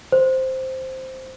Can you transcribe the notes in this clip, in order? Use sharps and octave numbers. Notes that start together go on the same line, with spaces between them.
C5